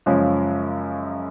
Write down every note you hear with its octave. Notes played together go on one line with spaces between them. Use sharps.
F#2 C#3 F3 G#3 C#4